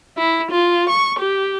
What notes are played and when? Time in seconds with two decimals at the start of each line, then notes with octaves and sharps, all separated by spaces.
0.17 E4
0.51 F4
0.89 C#6
1.19 G4